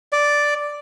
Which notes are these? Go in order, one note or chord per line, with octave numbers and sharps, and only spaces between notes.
D5